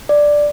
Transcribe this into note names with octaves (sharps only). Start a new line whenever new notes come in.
D5